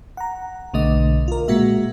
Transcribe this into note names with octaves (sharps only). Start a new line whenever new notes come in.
F#5 A#5
B1 D3 A3 D#5
F4 A#4
A#2 G#3 A#3 F#4 E5